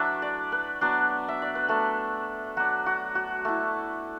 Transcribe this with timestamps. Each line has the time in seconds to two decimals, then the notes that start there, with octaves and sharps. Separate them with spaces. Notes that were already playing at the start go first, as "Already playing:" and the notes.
Already playing: F#3 A3 D4 E4 F#4 A4 B4 E5
0.22 D5
0.52 B4
0.81 F#3 B3 D4
1.29 E5
1.42 D5
1.55 B4
1.69 A3 D4 A4
2.57 F#3 D4 F#4
2.86 F#4
3.15 F#4
3.45 A3 E4